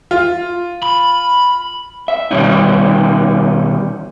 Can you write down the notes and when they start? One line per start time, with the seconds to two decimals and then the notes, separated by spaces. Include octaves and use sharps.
0.11 F4
0.83 B5
2.08 E5
2.31 B2 D#3 G3 C#4 D#4